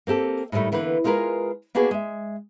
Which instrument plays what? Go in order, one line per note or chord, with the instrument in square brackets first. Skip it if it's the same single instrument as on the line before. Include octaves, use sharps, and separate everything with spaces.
[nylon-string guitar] A#3 C4 G4 A4
A2 D#3 E3 G3 A3
D3 E3 A#3 B3 B4
G#3 F4 G4 A#4 B4 G#5
A#3 B3 D4 F#4 G#4 B4
G#3 E5